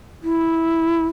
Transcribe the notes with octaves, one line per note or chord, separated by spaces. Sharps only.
E4